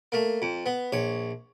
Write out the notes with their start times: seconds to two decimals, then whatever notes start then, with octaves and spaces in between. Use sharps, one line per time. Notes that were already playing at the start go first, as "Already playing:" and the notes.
0.12 A3 A#3
0.42 F2
0.66 B3
0.92 A#1 C#5